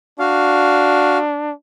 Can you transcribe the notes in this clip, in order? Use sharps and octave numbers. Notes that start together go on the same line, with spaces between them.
D4 F#4 F5